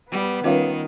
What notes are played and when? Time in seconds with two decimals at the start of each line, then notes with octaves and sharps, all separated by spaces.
0.11 G3 B3
0.44 D#3 G3 C#4 F4 B4 C#5 F5